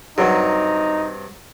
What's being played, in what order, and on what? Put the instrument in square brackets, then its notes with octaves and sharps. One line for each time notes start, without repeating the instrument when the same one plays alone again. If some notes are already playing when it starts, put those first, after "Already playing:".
[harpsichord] G2 C3 [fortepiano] F#3 [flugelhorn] D#4